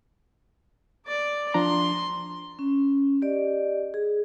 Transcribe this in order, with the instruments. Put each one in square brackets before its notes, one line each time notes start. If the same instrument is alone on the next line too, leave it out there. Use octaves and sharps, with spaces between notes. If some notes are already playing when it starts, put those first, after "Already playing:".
[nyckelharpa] D5 D6
[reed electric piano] F3 D4 A#5 [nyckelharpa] C6
[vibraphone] C#4
G4 D5 D#5
G#4